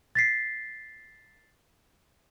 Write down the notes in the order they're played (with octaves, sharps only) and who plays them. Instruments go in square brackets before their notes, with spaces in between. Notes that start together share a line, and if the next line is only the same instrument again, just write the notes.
[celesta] A6 B6 C7